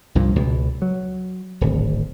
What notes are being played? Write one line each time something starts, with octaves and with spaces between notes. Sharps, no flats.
C2 G2 A#2 F3
C#2 B2
F#3
D1 G#1